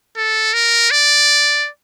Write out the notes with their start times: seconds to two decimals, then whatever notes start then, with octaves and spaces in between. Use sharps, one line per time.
0.17 A4
0.54 A#4
0.91 D5